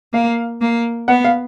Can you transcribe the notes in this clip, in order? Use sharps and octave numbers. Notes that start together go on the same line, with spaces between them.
A#3 F5
A#3
B3 F#5
F5